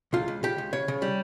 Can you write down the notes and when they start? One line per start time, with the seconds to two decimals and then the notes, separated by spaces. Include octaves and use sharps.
0.13 C#2 F4
0.28 C#2
0.43 C#3 G4
0.58 C#2
0.73 C#3 C#5
0.88 C#3
1.02 G3